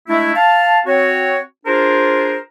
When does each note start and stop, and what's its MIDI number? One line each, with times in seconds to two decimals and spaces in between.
0.07 0.31 56
0.07 0.31 57
0.07 0.31 62
0.07 0.31 64
0.35 0.78 77
0.35 0.78 81
0.86 1.38 60
0.86 1.38 66
0.86 1.38 73
1.66 2.36 62
1.66 2.36 65
1.66 2.36 68
1.66 2.36 70
1.66 2.36 72